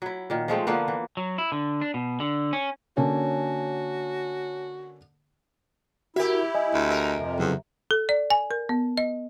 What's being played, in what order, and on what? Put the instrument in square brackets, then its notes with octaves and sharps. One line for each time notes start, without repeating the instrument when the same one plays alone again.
[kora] F#3 E4
A#2 D#3
F3 G#3 A3 C4
D3 F3 A#3 B3
E3
[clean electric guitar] F#3
E4
D3
D4
B2
D3
C#4
[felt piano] D3 A#3 C#4 [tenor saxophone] F#4 [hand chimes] C#5 G#5 A5
[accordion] E4 [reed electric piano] F#4 A#4 [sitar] G4 E5
[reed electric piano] D#5 G#5
[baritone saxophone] D2
[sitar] A#4
[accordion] F2 C3
[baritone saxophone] E2 [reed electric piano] C#3 F#3
[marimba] A4
D5
G#5
A#4
B3
D#5